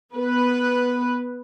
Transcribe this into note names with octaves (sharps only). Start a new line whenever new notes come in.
B3 B4